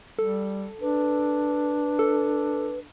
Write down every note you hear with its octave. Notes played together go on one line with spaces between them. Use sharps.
G3 A4
D4 B4
A4